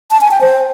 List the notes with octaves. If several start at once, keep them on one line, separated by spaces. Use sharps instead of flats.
A5
G#5
G5
C5